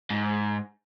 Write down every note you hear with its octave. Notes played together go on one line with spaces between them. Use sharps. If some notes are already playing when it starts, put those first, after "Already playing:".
G#2